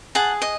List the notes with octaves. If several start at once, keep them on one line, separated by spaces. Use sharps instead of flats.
G#4 F#5 A5
D#5